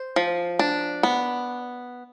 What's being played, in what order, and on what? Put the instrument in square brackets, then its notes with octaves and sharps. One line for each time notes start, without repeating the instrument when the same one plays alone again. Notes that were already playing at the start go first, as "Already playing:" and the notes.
Already playing: [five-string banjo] C5
F3
D4
B3